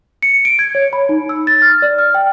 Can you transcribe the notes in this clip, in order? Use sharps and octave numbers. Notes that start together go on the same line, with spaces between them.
C#7
D7
G#6
C#5
B5
D#4
E6
A6
F6
D5
F6
G5